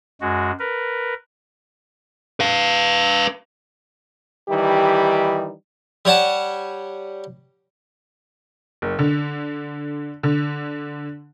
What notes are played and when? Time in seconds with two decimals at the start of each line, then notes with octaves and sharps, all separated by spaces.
0.21 F#2 G#3 F#4
0.59 A#4 B4
2.40 B4 F5
4.49 D#3 E3 G3 D#4 G4
6.05 G3 C#5 F#5 A5
8.82 F#1
8.99 D3
10.23 D3